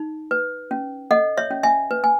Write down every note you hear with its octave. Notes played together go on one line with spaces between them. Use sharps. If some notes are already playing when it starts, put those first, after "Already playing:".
Already playing: D#4
B4
C#4
A4 D#5 F#5
C#5 E5
C#4
E5 G#5
B4
G#5